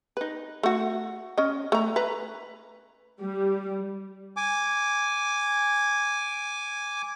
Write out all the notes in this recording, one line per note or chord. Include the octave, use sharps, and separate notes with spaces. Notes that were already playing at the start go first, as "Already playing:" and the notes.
D#4 B4
A3 F#4
C#4 D#5
A3 A#5
B4 A#5
G3
G#5 D6